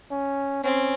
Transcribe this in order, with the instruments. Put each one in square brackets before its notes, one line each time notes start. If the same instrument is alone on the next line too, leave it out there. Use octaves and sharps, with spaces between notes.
[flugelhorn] C#4
[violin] C4 [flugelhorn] C#4